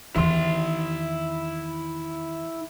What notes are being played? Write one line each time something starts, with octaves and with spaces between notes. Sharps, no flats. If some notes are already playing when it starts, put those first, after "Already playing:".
E2 D#3 E4 C6